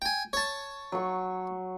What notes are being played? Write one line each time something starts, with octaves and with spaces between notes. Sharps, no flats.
G5 G#5
C#5 A5
F#3 C#6